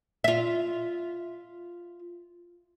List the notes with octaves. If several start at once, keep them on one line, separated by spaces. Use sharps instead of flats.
F4 E5